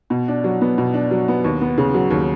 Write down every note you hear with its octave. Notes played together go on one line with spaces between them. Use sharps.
B2
D4
F#3
B3
B2
D4
F#3
B3
D#2
B3
C#3
F#3
D#2